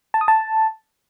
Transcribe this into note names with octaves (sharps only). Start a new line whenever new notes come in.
A5
D#6
A5